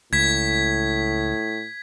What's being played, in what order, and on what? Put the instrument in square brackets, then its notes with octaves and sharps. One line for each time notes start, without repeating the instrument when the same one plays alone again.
[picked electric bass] C#2 [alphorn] A2 [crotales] G#6 B6